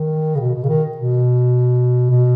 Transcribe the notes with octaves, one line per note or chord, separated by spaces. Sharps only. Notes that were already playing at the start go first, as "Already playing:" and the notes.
Already playing: D#3
C#3
B2
B2
C#3
D#3
B2
B2